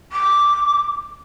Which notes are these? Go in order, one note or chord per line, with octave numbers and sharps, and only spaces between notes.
D6